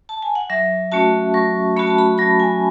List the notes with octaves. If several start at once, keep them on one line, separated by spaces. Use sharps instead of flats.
A5
G#5
F#5
F#3 E5
A3 C#4 F#4 A5
F#3 C#6
A3 C#4 F#4 B5
A5
B5
F#3 B5
G#5